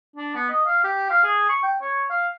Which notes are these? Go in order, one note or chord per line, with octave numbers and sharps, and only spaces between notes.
D4
B3
D#5
F5
G4
F5
G#4
C#6
G5
C#5
F5